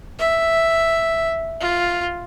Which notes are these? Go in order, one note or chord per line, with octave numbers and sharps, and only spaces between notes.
E5
F4